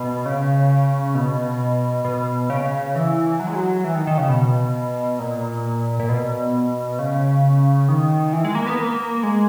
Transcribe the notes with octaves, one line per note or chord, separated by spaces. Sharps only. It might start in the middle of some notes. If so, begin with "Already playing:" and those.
Already playing: B2
C#3
B2
B2
C#3
E3
F#3
G#3
F#3
E3
D#3
D#3
C#3
B2
A#2
A#2
B2
C#3
D#3
E3
G#3
A#3
B3
A#3
G#3